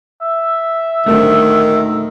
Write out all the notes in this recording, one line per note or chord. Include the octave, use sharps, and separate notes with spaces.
E5
D#1 D2 D3 D#3 A3